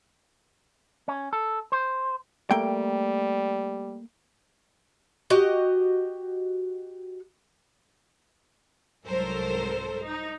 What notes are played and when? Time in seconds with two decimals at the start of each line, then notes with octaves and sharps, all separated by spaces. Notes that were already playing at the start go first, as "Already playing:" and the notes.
1.08 C#4
1.33 A4
1.72 C5
2.51 G3 A3 A#3 G5
5.30 F#4 G4 D#5
9.06 C2 G#2 F#3 A4 A#4 C5
10.04 D#4